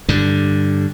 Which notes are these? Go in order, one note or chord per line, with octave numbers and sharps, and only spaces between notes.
G2 D3